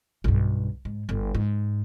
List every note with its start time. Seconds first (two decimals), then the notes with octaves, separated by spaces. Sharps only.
0.24 B1 G2
0.85 G#2
1.09 G1
1.35 G#2